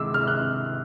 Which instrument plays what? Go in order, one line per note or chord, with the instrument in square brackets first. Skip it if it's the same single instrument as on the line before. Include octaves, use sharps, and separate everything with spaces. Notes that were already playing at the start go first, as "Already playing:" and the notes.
Already playing: [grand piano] C3 D#3 G#3 D6 E6
C3 F6
F#6